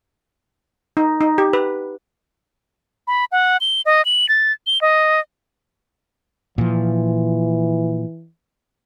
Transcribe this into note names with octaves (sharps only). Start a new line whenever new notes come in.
D#4
D#4
G4
B4
B5
F#5
G7
D#5
F#7
A6
G7
D#5
A#2 E3 F3